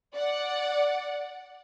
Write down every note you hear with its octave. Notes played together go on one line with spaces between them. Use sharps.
D5 F#5